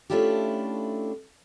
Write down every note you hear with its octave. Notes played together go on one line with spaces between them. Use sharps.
A3 C#4 D4 E4 F4 G4